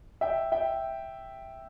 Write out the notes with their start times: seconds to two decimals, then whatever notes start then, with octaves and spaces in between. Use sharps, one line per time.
0.21 E5 G5
0.52 E5 G5